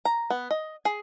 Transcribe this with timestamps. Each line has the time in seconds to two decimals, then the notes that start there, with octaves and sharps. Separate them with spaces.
0.05 A#5
0.30 B3
0.51 D#5
0.85 G#4